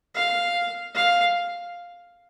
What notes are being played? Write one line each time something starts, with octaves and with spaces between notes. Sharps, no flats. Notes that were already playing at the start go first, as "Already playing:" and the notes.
F5
F5